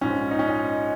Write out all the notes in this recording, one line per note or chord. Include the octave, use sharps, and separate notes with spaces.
A#1 G#2 F3 C#4
D#4
C#4
D#4